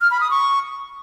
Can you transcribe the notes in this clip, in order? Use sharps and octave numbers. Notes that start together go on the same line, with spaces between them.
F6
B5
D#6
C#6